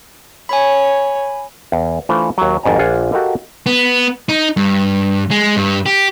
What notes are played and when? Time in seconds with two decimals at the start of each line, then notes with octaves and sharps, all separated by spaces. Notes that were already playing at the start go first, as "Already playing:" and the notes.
0.49 C#5 G#5 B5
1.72 E2
2.09 E3 A3 D4 F4 C5
2.38 D#2 F#3
2.63 G#1 F2 G#2 D5 G#5 A#5
2.79 A#1 D4 F4 F#5 G#5
3.12 F#4 G4 A4 A#4 D#5 F5
3.66 B3
4.29 D#4
4.57 G2
5.31 G#3
5.56 G2
5.86 G4